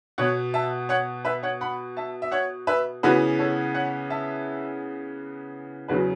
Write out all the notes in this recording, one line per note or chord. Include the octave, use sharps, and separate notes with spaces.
B2 B3 C#5 F#5
E5 A5
C#5 F#5
B4 E5
C#5 F#5
F#5 B5
E5 A5
E5
C#5 F#5
B4 E5
C#3 E3 B3 F#4 B4
A4 C#5
C#5 F#5
E5 A5
E2 C#3 F#3 F#4 B4